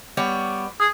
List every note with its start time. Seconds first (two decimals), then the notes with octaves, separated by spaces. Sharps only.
0.17 G3 B3 C#5
0.79 G#4